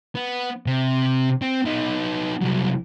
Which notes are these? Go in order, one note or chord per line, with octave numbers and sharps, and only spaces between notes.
B3
C3
C4
B3 D#4
C2 F#3